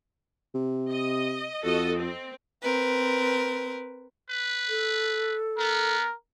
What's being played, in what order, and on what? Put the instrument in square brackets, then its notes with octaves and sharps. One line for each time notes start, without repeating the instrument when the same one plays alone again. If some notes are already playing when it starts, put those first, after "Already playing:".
[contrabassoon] C3
[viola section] D#5
[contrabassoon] F2 [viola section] F#4 A4 D#5
[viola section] C4
[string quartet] C4 A#4 B4
[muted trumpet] B4
[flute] A4
[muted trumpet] B3 [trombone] A#4